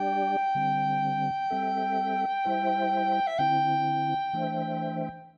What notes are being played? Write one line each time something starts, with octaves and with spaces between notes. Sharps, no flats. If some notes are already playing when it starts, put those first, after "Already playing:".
Already playing: G3 D4 G4 D5 G5
D3 G3 C4
G3 C4 A4 E5
G3 E4 C5 E5
E5
D3 C4 E4 G5
E3 A3 D4 C5 E5